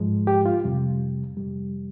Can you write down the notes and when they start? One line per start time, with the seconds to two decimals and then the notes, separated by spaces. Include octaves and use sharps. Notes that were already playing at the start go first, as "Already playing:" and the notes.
Already playing: G#2 F3 G#3
0.27 G4
0.46 F4
0.64 F2 C3 G3
1.37 F2 C3 G3